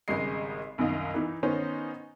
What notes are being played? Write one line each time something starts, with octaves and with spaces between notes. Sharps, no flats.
G#1 C#3 G3 G#3 D#5 C7
C2 F#2 D#3 D#5 F5
E3 D#4
D#3 B3 C#4 D#4 C5